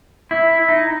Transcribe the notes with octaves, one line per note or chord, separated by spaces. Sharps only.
E4
D#4